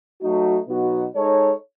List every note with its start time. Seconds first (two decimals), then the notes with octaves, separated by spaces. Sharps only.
0.21 F#3 A3 D#4 F#4
0.68 B2 F#3 B3 D#4 F#4
1.15 G#3 D#4 A4 C#5